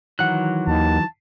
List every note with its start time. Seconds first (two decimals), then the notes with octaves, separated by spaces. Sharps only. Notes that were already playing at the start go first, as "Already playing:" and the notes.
0.19 D#3 E3 F#3 F#5 F#6
0.68 D#2 A5